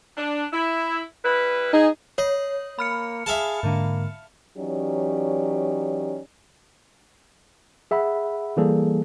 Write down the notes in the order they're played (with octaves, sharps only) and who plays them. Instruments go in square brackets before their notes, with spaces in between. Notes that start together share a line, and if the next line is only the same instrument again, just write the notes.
[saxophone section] D4
E4
G3 E4 B4
[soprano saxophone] D#4 [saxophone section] G#4
[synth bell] C#5 [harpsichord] D#5
[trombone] A#3 [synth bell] B5 F6 C#7
[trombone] G#4 [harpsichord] E5 F5 A5
[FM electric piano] G#2 D3 [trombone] A#3
[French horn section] E3 F#3 C#4 D#4 G4 D5
[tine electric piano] G#4 E5 F#5 B5
E3 G3 A#3 G#4 A4